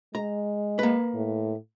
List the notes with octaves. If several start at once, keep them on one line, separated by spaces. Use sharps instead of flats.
G#3 A#5
A#3 B4
A2